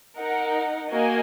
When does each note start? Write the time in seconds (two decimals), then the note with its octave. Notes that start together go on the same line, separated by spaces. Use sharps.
0.16 D#4 A#4 F#5
0.91 A#3 F#4 A#4 D#5 G#5